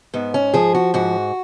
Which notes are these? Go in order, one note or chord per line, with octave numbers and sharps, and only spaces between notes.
G#2 B3
C#4
F3 G#4
F#4
G#2 F#4